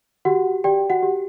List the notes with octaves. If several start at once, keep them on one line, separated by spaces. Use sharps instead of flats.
F#4 G4 F#5
G4 D5 G5
F#4 F#5
G4